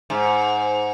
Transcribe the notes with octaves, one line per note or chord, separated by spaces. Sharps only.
G#2